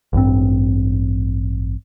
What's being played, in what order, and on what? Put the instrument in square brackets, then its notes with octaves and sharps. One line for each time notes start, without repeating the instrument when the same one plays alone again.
[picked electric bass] A1 G2 C4